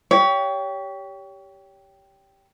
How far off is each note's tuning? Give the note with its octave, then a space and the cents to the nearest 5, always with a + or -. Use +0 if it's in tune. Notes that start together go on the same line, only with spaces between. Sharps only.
G4 +0 C#5 +30 F5 -25